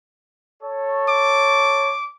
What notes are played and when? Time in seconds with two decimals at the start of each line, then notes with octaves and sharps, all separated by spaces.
0.63 A4 C#5
1.09 D6